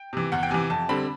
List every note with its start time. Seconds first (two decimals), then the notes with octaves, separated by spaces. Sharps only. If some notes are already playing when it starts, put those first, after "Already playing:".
Already playing: G5
0.13 C3 E3
0.32 E2 F#5
0.43 G5
0.50 C3 E3 G#5
0.70 F2 A5
0.89 D3 G3 C4 B5